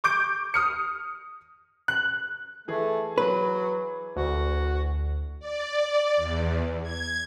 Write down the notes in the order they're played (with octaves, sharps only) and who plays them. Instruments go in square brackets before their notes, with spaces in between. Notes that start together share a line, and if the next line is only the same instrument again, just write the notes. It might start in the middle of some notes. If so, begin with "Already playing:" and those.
[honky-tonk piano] C#6 D6 G6 D7
D#6 F6 C#7
F#6
[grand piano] E3 G#4 [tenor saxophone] A3
[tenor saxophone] F#3 [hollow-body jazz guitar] B4
[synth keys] D2 [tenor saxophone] F#4
[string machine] D5
E2
G#6